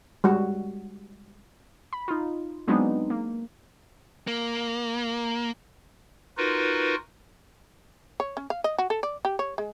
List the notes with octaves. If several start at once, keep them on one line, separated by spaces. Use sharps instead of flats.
G3 G#3 F#4
B5
D#4 F4
F#3 G#3 B3 C4 D4 D#4
A#3
A#3
D#4 F4 F#4 A#4 B4
C#5
C#4
F5
D#5
F#4
A4
D5
G4
C#5
G#3